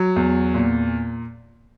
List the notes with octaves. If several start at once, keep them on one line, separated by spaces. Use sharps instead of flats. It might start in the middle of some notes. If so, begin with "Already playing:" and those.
Already playing: F#3
E2
A#2